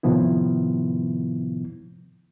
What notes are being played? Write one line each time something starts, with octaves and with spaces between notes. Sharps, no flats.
A2 C3 D#3 F3 B3 E4